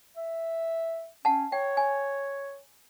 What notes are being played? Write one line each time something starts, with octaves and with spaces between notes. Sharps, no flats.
E5
C#4 F#5 A5
C#5 G5
G#5